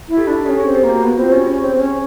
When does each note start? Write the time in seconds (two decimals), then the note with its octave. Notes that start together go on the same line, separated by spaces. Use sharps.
0.08 E4
0.17 G4 A4
0.27 D4
0.46 C#4 G4 A4
0.60 G#4
0.66 C4
0.75 G4
0.84 A#3
0.89 F#4
1.03 B3 F#4
1.17 C4 F4
1.32 C#4 G4
1.46 C#4 G#4
1.61 C4
1.75 C4
1.79 C#4